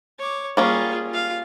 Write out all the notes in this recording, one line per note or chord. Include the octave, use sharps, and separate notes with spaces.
C#5 D6
G3 A#3 C#4 F4 G#4
F4 F5